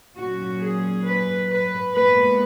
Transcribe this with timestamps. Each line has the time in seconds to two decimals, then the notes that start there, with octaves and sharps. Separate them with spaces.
0.17 A#2 F#3 C#4 F#4
0.61 G#4
1.05 B4
1.49 B4
1.94 A#2 G#3 B3 B4